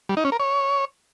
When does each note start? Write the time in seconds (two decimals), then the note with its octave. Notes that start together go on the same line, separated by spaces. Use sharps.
0.09 G3
0.17 D#4
0.24 C#4
0.32 A#4
0.40 C#5